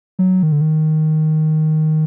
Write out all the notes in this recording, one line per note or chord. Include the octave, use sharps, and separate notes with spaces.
F#3
D#3
D3
D#3